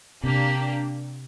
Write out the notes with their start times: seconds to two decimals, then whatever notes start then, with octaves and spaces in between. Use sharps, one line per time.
0.22 C3 A#3 D4 G4